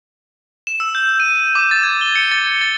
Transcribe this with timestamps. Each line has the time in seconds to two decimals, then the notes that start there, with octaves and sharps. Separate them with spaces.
0.67 E7
0.80 E6
0.95 G6
1.20 D#7
1.37 D#7
1.55 D6
1.71 A6
1.83 G#6
2.01 G7
2.16 C#7
2.31 A6
2.61 A6